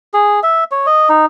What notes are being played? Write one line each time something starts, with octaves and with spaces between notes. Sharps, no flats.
G#4
E5
C#5
D#5
D#4